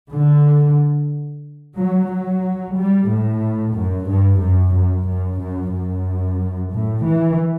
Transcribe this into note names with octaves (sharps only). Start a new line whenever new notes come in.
D3
F#3
F#3
G3
A2
F#2
G2
F#2
F#2
F#2
F#2
F#2
A2
E3